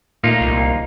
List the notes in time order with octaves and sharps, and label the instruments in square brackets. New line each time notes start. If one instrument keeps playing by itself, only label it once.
[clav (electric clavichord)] A#2 A3 [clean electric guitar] A#3 D#4 F4
[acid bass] C2